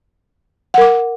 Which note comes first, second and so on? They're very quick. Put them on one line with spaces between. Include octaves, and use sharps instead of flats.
F#5 A#4 D6